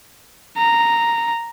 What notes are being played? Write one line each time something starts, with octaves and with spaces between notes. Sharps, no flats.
A#5